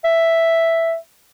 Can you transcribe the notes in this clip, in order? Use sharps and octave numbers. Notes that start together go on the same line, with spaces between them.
E5